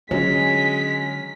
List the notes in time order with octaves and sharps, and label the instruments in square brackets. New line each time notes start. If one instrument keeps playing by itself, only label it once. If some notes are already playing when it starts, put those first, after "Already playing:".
[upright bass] D3 [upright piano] F#3 C#4 [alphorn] G#3 [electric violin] B6